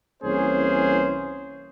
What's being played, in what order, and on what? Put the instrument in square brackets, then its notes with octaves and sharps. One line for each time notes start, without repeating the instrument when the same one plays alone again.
[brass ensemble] C2 E3 A#3 C#4 G#4 C5